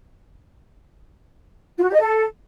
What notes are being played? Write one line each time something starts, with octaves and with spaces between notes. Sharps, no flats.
F4
F#4
G4
D#5
A4